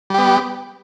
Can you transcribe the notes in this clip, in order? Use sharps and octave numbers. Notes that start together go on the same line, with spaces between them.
G3 B3 G4